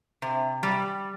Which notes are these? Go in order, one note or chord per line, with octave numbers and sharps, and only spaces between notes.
C3
G3